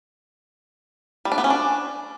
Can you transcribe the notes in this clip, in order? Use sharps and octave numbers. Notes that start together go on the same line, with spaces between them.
G3
D4
B3
C#4
D4